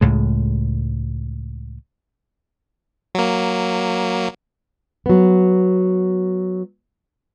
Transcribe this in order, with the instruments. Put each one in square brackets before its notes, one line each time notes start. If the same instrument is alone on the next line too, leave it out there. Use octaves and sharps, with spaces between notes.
[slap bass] C#2 A2 G#3
[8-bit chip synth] F#3 A#3
[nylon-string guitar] F#3 B3